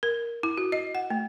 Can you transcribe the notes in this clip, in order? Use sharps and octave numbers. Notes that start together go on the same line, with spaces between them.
A#4
E4
F#4
D#5
F#5
A3